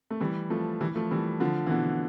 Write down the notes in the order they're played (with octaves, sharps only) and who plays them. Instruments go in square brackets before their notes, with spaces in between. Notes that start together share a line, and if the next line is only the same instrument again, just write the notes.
[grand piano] A3
E3 G3
F3 A3
E3 G3
F3 A3
E3 G3
D3 F3
E3
B2 D3